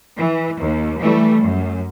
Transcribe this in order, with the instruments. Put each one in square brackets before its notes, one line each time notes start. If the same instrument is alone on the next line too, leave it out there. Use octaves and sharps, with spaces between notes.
[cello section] E3
D#2
E3 G3 A3
F#2